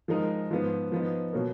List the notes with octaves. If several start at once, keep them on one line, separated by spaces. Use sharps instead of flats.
F3 G#3 D#4 A#4
G#2 F3 B3
F3 B3 D#4
B2 F#3 A#3